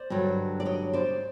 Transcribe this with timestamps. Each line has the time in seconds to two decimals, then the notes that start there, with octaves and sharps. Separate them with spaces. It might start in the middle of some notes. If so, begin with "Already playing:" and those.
Already playing: C5 D5
0.10 G2 D3 F#3
0.60 D5
0.66 C#5 D#5
0.93 C5 D5